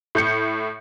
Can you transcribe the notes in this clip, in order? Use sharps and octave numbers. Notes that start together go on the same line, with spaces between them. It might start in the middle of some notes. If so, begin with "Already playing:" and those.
A2 G6 C#7